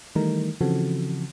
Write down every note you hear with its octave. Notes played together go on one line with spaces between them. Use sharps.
D#3 E3 G3 A3 D#4 A#4
C#3 E3 F3 C4 F#4 A4